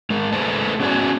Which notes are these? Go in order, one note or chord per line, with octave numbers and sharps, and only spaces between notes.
G#3 A#4
A3 G#4 B4 C5 A5
B3 C#4 F#4 D5 G#5 A5